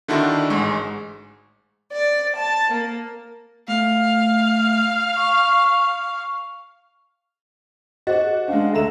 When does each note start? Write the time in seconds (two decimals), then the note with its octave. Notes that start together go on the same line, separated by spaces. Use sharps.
0.08 D3 D#3 D4 E4 F#4 A4
0.50 A1 G#2 G#3 C#6
1.92 D5
2.36 A5
2.71 A#3
3.68 A3 F5
5.16 C#6
8.07 F#4 G#4 C5 D#5
8.48 G#3 C#4 D4 F5
8.74 D2 A4 E5 A#5 E7